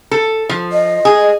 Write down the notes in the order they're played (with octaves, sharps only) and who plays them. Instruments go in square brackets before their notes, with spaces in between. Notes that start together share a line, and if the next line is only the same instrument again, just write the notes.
[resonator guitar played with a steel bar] A4
F3
[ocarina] D#5
[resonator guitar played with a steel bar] G#4